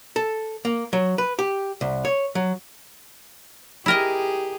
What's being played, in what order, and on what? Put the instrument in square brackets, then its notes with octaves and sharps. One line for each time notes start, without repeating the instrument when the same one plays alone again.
[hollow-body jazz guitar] A4
A#3
F#3
B4
G4
C2
C#5
F#3
[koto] E4 A#4 D#5 [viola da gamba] G4 G#4